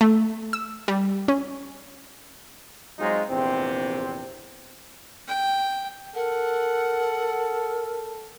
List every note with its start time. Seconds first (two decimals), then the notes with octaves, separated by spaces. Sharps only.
0.01 A3
0.53 E6
0.88 G3
1.28 C#4
2.99 F#3 G#3 C4 D#4 F4
3.30 A#1 E2 C3 C4
5.28 G5
6.15 A4 A#4 F#5